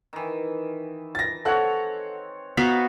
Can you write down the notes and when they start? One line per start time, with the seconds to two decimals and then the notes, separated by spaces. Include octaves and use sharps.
0.13 D#3 E3
1.15 A6 A#6
1.45 C4 A4 C#5 F#5 F#6
2.57 B3 D#4 F#4 F5 B6